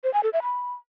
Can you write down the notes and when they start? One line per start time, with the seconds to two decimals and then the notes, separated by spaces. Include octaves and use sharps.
0.04 C5
0.14 G#5
0.23 A4
0.33 E5
0.43 B5